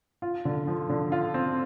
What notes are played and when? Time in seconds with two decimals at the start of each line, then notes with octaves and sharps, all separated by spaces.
0.22 F4
0.45 D3
0.67 F3
0.89 D3
1.12 F4
1.34 C4